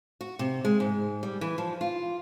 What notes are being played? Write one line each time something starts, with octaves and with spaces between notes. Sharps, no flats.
F#4
C3
G#3
G#2
G3
E3
F3
F4